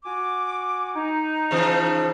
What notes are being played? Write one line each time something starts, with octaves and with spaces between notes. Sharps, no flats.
F#4 G#5 D6
D#4
C#3 E3 F3